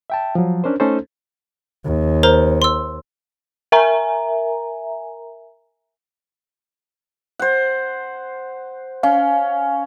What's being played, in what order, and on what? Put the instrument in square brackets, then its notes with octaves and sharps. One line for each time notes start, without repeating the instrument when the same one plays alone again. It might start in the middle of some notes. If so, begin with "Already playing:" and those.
[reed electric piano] E5 G5 A5
F3 F#3
C#4 D4 A#4 C5
A3 C#4 D#4 A4 C5
[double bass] D#2
[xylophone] A#4 C5 A#5
C6 E6
[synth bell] A#4 E5 G#5 A#5
[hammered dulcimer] C5 F#5
[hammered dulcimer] C#4 [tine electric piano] F5